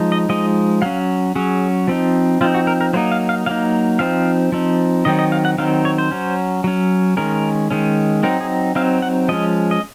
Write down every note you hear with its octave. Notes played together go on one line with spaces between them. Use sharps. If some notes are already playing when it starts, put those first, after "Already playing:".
Already playing: F3 G#3 D#4
D#5
F3 G#3 D#4 D#5
F#3 C#4 F5
F#3 C#4 G#4
F3 C4 D#4
F3 C4 D#4 F4
F#4
A#4
A#4
F#3 A#3 D#4 C5
F5
F5
F#3 A#3 D#4 F5
F3 C4 D#4 F5
F3 C4 D#4
D#3 F#3 C4 D#4 D#5
D#5
F5
F#5
D#3 F#3 C4 D#4 F5
C#5
C5
F#3 C#4
F#3 C#4
D#3 G#3 C#4 A#4
D#3 G#3 C#4
F#3 C4 D#4 A#4
G#4
F#3 C4 D#4 F5
F#5
F3 G#3 C#4 D#5
D#5